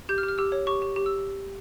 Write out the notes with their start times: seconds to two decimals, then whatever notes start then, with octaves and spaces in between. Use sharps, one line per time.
0.09 G4 G6
0.18 F6
0.23 G4
0.28 F6
0.38 G4 E6
0.52 C#5
0.67 G4 C#6
0.82 G4
0.96 G4
1.06 E6